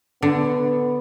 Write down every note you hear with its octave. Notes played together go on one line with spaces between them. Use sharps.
D3 B3